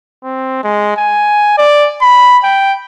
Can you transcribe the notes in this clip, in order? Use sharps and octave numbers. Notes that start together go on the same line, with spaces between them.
C4
G#3
G#5
D5
B5
G5